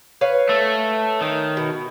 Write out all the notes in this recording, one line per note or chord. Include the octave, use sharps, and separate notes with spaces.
B4 C#5 F5
A3
D#3
B2